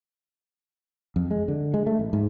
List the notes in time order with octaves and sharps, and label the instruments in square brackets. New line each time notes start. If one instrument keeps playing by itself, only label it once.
[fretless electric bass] F2
G#3
D3
G#3
A3
A1
G#2